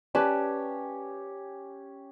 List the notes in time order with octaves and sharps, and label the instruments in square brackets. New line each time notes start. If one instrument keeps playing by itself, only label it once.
[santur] C#4 G4 [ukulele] B4 D5 A5